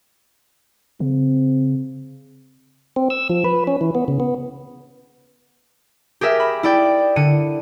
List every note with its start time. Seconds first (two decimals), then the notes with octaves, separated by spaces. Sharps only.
1.00 C#3 C4
2.96 C4
3.10 E6
3.30 F3
3.44 B4
3.67 C#4
3.81 E3
3.95 B3
4.08 C#3
4.20 B3
6.21 G4 G#4 A#4 E5
6.40 B5
6.63 E4 D5 G5
7.16 D3 C#7 D#7